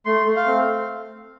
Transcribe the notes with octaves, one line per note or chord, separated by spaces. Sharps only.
A3 C6
A3
F5
C4